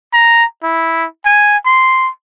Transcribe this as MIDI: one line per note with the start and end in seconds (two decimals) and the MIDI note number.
0.13 0.44 82
0.63 1.05 64
1.25 1.57 80
1.65 2.09 84